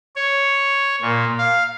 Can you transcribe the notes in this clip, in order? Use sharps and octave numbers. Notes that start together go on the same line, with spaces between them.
C#5
A#2
F5